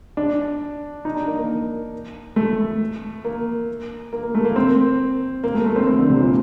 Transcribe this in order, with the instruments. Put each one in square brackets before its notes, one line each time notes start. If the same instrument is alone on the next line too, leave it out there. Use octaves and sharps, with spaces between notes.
[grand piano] D4
D#4
D4
A#3
A#3
A3
A#3
A#3
A#3
A3
A#3
C4
A#3
A3
A3
C4
C4
D3
C3
A#2